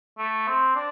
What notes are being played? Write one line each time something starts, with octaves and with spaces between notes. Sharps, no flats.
A3
C4
D4